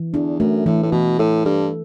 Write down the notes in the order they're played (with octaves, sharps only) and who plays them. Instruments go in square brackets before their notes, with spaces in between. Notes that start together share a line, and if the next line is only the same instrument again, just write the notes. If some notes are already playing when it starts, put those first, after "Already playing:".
Already playing: [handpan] E3
[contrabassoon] E2 [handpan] D4
[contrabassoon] F#2 [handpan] A3
[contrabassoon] A2 [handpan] E3
[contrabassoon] A2
[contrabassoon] B2 [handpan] E3
[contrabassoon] A2 [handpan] A4
[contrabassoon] G2 [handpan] A4